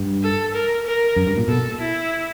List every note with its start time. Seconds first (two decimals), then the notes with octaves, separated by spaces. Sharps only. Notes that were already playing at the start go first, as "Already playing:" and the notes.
Already playing: G2
0.23 A4
0.54 A#4
0.85 A#4
1.16 F#2
1.27 G2
1.37 A#2
1.48 B2 A4
1.79 E4